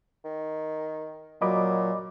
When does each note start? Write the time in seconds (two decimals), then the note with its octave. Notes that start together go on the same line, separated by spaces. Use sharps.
0.25 D#3
1.42 A#2 F#3 D#5 B5 D6